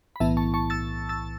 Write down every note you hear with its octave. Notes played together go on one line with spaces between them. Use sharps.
B5
B1 A2 E3 B3 E4 E5 A5
A5 C#6
A5 C#6
E6 A6
E6 A6